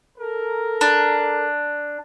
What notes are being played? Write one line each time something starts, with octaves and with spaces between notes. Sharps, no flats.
A4 A#4
D4